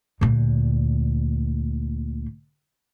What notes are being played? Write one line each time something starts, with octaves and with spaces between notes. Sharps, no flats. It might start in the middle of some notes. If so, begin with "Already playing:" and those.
D2 A#2